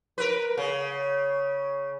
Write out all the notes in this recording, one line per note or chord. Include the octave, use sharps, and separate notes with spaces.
A#4 B4
C#3